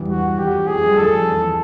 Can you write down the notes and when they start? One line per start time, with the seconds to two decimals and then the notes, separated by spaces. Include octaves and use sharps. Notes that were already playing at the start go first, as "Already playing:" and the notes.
Already playing: E2 G2 E3 G3
0.08 F#4
0.38 F2 F3 G4
0.67 F2 F3 G#4
0.83 G2 G3
0.97 F2 F3 A4
1.27 E2 E3